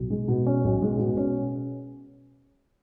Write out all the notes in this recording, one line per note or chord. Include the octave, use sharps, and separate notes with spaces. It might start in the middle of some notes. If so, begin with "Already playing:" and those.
Already playing: B1
G#3
B2
C#4
B1
G#3
B2
C#4